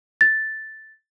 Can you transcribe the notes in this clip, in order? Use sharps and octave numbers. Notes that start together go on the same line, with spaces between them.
A6